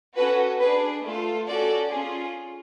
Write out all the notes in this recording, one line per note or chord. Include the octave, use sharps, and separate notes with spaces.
C#4 F#4 A4 B4
D4 G#4 B4
A3 F4 A4
C#4 F#4 A4 D5
C#4 F4 G#4